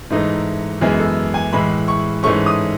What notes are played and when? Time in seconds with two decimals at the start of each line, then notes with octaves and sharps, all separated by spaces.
0.10 G#2 E3 A3 D#4
0.81 F#2 E3 G#3 B3 G#4
0.99 A4
1.34 G#5
1.53 A2 E3 G#3 B5
1.88 C#6
2.23 G#2 E3 A3 C#4 C#6
2.46 D#6